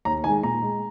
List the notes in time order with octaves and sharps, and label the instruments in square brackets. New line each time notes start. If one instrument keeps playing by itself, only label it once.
[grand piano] D#2 A#5
D#3 G#3 G#5
A#2 A#5
G#3